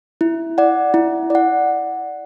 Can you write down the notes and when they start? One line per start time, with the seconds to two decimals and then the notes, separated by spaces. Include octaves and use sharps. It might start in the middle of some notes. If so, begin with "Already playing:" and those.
0.21 E4
0.58 D5 F#5
0.94 E4
1.30 D5 F#5